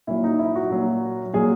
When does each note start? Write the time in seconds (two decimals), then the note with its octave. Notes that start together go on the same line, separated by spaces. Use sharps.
0.07 A#2 F#3 E4
0.24 D#4
0.39 E4
0.55 F#4
0.71 A#2 F#3
1.33 A#2 F#3 G#4